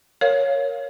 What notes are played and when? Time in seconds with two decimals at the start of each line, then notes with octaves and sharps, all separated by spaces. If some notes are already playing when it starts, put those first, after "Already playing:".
0.21 A#4 C#5 F5